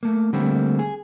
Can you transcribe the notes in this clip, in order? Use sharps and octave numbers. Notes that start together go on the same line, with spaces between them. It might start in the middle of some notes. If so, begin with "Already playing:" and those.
A3 A#3
D3 G3 A3 A#3 C4
G#4